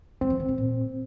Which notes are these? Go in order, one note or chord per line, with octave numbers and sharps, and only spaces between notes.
G3 C4
F3
C#3
C3
A#2